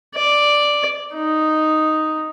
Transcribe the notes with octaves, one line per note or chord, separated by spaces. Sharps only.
D5
D#4